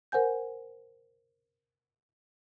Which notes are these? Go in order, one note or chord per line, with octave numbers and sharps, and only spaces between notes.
A#4 C5 F#5 G#5 G6